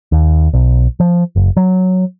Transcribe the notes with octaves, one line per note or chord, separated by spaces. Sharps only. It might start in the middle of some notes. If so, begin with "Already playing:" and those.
D#2
B1
F3
F#1
F#3